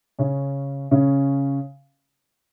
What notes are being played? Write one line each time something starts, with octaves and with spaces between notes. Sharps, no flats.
C#3 C#4
C#3 C#4